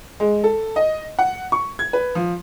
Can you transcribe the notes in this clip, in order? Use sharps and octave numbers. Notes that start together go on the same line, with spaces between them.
G#3
A4
D#5
F#5
C#6
G#6
B4
F3